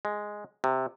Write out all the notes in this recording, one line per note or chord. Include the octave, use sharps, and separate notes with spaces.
G#3
C3